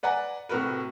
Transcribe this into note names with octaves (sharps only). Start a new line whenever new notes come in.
B4 D5 F#5 G#5 A#5
A2 C3 F#4 A#4 B4